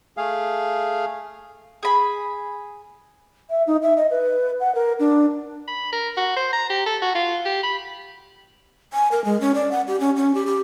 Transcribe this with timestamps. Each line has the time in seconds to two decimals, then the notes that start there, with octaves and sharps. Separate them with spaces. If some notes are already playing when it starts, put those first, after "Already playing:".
0.17 A3 G#4 F5
1.83 G#4 B5
3.50 E5
3.67 D#4
3.83 E5
3.97 D#5
4.11 B4
4.60 F#5
4.75 A#4
4.99 D4
5.67 B5
5.92 A#4
6.17 F#4
6.36 C5
6.53 A#5
6.70 G4
6.86 A4
7.02 F#4
7.15 F4
7.45 G4
7.63 B5
8.93 G#5
9.11 A#4
9.25 G#3
9.41 C#4
9.55 D5
9.71 F#5
9.87 G4
10.00 C#4
10.16 C#4
10.35 G4
10.46 G4